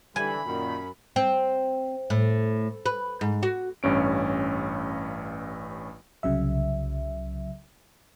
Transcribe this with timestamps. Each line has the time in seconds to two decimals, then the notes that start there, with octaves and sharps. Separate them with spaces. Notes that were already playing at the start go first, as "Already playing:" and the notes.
0.16 D3 E3 G3 G#5 B5
0.46 F#2 A#2 D#3
1.16 C4
2.10 A2
2.86 B4
3.21 G#2
3.43 F#4
3.83 A1 G2 C#4 D7
6.23 C2 C#3 F#3 E5